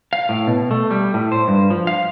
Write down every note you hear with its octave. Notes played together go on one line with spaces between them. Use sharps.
F5
A2
B2
A3
G3
A2
C5
G2
F3
F5